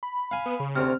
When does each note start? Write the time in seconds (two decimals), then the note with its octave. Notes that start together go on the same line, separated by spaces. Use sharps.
0.03 B5
0.31 F5 G#5
0.46 B3
0.60 C#3
0.76 D2 C3 F6